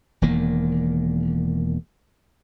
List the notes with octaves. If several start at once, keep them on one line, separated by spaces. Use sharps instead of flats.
E1 E2 D#3 A#3